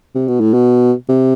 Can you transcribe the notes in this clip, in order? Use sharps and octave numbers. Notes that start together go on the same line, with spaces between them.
C3
B2
A2
B2
C3